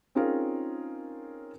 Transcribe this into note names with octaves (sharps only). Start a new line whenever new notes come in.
C4 C#4 D#4 F4 G#4 A#4